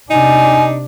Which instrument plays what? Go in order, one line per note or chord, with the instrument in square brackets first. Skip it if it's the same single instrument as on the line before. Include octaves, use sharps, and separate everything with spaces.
[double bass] C3 D4 [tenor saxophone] D#4 [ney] G#5